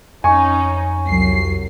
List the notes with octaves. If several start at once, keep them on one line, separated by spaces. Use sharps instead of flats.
F2 C#4 D#4 G#5 C#6
C2 F#3 C7